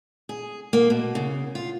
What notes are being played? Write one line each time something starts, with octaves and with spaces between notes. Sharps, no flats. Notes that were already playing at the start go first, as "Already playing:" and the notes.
G#4
A#3
B2
C#3
F4